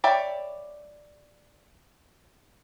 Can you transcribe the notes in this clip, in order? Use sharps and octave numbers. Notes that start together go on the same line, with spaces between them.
C#5 D5 E5 G5 B5